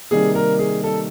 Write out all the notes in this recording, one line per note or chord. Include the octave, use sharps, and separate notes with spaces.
C3 D#3 G3 A#3 G#4
A#4
G#4
A4